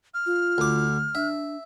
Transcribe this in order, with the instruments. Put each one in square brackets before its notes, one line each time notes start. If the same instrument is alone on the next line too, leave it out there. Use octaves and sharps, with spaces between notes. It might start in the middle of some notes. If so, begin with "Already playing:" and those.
[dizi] F6
[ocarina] F4
[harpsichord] D2 D6
[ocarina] D4 [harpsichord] E5